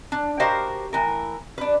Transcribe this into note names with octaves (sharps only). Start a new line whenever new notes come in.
D4
F#4 G4 A#4 C5 D#5 F5
A2 E3 A#4
D4 B4